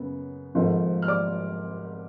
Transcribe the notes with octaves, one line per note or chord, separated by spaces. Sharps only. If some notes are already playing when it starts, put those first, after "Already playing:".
Already playing: F#2 C#3 B3
G#1 G#2 F3 A3
F6
D5 D6